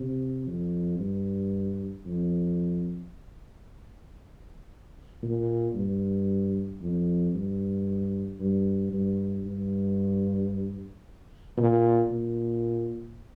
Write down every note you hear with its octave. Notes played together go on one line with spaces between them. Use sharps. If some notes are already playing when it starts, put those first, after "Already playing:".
Already playing: C3
F2
G2
F2
A#2
G2
F2
G2
G2
G2
G2
A#2
A#2